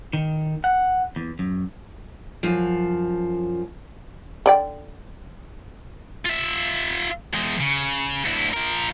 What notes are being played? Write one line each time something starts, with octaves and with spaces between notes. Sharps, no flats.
D#3
F#5
E2
F#2
F#2 F3
D3 D5 G5
F4 E5
E2 G#3
C#3
D2 E4
F3 A#4